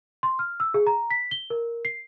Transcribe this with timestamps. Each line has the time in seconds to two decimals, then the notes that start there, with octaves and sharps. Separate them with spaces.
0.23 C6
0.39 F6
0.60 E6
0.74 G#4
0.87 A#5
1.11 B6
1.31 G7
1.50 A#4
1.85 C7